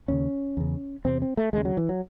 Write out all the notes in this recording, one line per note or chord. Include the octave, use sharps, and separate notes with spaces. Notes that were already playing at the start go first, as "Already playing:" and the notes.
D#2 C#3 C#4
E2 C#3
E2 C3 C4
C4
A3
D#2 C#3 G#3
F#3
E3
F#3